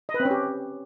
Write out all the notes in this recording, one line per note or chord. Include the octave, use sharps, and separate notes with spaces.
D#5
B4
C4
C#4
G4